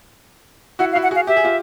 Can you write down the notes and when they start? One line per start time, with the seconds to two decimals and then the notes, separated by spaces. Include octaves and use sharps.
0.79 E4 F#4 F#5
0.92 F5
0.95 E4 F#4
1.03 F#5
1.11 F#4 G#4 F5
1.27 G4 E5
1.36 G#4
1.44 F4 G4